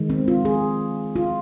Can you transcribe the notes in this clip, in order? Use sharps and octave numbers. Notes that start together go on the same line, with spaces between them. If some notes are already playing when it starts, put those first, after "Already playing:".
Already playing: D#3 G#3
C4
F4
G#4
F4